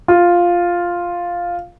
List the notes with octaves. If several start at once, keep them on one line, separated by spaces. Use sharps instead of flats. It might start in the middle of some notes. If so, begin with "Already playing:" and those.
F4